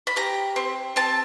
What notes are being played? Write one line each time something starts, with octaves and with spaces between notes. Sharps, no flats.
B5
G4 A#5
C4
C4 A5